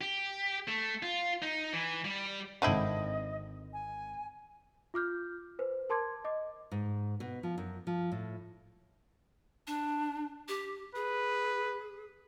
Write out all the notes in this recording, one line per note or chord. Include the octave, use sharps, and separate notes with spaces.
G4
A3
F4
D#4
E3
G3
G#1 D3 C4 E4 D#5 D#7
G#5
F4 D6 F6 G6
B4 C5
A#4 A5 C6 D6 G#6
D#5 D6
G#2
B2
F3
F#2
F3
A2
D4
G4
G#4 B4